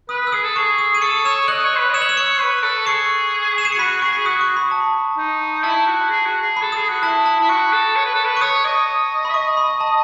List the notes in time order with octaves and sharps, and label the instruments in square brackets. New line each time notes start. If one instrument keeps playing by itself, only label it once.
[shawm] B4 [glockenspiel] D#6
[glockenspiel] E6
[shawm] G#4 [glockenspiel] D#6
[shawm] A4
[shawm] G#4 [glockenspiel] C#6
[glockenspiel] D#6
D#7
[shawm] A4 [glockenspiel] C#6 C#7
[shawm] C#5 [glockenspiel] E6 E7
[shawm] D#5 [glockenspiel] F#6 F#7
[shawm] C#5
B4
D#5
[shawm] C#5 [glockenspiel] E7
[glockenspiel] F#7
E6 E7
C#6 C#7
[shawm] B4
A4
[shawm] G#4 [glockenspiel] C#6 C#7
[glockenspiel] E7
D#7
C#7
[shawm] F#4 [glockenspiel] B5 B6
[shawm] G#4 [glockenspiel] C#6
[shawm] G#4
[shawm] F#4 [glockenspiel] D#6
[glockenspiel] C#6
B5
A5
[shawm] D#4
[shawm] E4 [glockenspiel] A5
[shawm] F#4
G#4
F#4
G#4
[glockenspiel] B5
[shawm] A4
[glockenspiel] D#6
[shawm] G#4
F#4
[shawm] E4 [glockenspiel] A5
[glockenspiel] A5
[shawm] E4
[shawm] F#4 [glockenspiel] C#6
[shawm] A4
C#5
B4
A4
B4
[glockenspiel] C#6
[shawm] C#5 [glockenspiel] D#6
[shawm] D#5
[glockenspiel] B5
[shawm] E5
[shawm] D#5 [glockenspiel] C#6
[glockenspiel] B5
A5